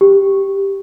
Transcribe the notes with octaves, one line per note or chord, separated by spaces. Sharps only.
G4